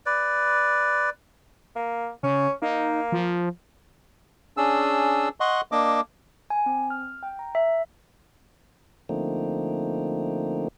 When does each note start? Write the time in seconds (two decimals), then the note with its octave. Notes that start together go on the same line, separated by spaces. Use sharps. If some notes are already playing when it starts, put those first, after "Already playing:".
0.06 B4 D5
1.76 A#3
2.23 C#3 C#4
2.62 A#3 D#4
3.12 F3
4.57 C#4 D4 G#4 E6
5.40 D#5 F#5 C6 C#6
5.72 A#3 D4 D#5 D6
6.50 G#5
6.66 C4
6.90 F6
7.23 G5
7.39 A#5
7.55 E5
9.09 D3 F3 A3 A#3 C4 D#4